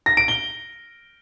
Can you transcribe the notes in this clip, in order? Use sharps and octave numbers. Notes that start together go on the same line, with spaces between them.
A#6
D7
G7